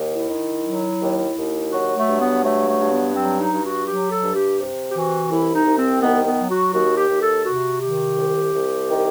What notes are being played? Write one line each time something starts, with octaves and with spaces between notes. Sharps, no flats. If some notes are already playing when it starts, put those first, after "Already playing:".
Already playing: D#2
E4
D#3
F#3
D#2
D#2
F#3 F#4
A3
G2
B3
F#3 A3
A3
G2
B3
F#3 C4
D#4
G2
F#4
F#3 G4
A4
G2
G4
C3
G4
E3 F#4
C2 E4
D#4
C2
C4
D#3 B3
B3
F#3
F#4
D#2 F#4
G4
D#2
A4
C3 F#4
D#3 G4
C2
C2
D#3